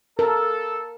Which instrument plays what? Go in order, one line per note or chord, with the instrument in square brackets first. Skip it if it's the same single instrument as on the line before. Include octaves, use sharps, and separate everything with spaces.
[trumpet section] A4 [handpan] A#4